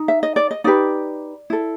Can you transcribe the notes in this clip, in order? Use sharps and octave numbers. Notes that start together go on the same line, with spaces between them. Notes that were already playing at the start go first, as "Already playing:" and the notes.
Already playing: D#4
E5
D#5
D5
D#5
D#4 G4 B4 D5
E4 A4